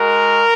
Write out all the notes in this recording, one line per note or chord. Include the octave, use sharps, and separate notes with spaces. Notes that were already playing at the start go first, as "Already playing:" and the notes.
Already playing: G#3 F#4 A#4